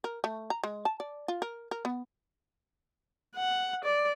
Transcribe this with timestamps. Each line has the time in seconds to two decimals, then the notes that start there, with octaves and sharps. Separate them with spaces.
0.04 A#4
0.24 A3
0.50 A#5
0.64 G#3
0.85 A5
1.00 D5
1.28 F4
1.42 A#4
1.71 A#4
1.85 B3
3.36 F#5
3.84 D5